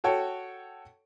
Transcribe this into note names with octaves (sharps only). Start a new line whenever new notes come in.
F#4 A4 C#5 G5